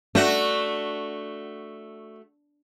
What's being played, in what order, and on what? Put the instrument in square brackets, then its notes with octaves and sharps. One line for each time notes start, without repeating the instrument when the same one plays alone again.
[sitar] A3 F#4 [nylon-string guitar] D4